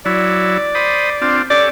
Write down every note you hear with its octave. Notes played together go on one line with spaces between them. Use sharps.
F#3 E4 D5
C5 B5 D#6
C4 D4 F4
C#4 G4 A4 D5